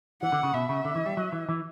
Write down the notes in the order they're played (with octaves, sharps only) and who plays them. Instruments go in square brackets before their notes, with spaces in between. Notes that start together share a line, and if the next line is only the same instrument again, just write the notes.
[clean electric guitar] E3 [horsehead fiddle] F#5
[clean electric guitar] D3
C#3
[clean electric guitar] B2 [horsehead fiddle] E5
[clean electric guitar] C#3
D3
E3
G3
F#3
E3
E3